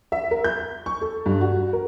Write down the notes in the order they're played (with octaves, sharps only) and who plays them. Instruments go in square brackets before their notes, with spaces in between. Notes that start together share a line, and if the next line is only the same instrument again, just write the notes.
[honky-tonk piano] E5
A#4
G6
C#6
A4
G2
F#4
A#4